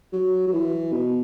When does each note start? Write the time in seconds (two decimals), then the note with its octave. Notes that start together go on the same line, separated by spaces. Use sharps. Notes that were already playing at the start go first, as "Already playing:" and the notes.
0.13 F#3
0.47 F#3
0.53 E3
0.92 B2